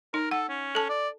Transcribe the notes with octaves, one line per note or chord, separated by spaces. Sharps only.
D#4 A#4
A4 F#5
C#4
A4 A5
D5